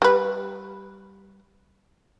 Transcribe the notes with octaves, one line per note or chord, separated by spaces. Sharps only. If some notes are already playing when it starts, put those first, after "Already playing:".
G3 B4